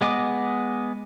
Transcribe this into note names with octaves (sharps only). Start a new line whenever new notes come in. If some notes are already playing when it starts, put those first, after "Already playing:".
G#3 B3 D#5 G#5 D6